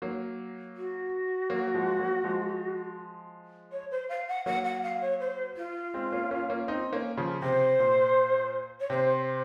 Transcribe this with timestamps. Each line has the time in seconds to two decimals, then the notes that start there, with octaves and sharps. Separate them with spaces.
0.02 F#3 A#3
0.76 F#4
1.50 F#3 A#3
1.74 F3 G#3
1.99 F#3 A#3
2.24 F3 G#3
3.72 C#5
3.90 C5
4.09 F5
4.28 F#5
4.46 F#3 A#3 F#5
4.64 F#5
4.83 F5
5.01 C#5
5.20 C5
5.56 F4
5.94 G#3 C4
6.12 A#3 C#4
6.31 A#3 C#4
6.50 A#3 C#4
6.68 C4 D#4
6.93 A#3 C#4
7.17 C#3 F3
7.42 C3 C5
7.79 A#2
8.80 C#5
8.90 C3 C5